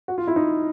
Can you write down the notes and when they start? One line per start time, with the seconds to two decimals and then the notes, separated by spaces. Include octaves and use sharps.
0.08 F#4
0.18 F4
0.27 E4
0.36 D#4